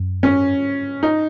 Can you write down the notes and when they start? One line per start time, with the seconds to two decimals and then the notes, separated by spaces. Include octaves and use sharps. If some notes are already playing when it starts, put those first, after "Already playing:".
Already playing: F#2
0.23 C#4
1.03 D#4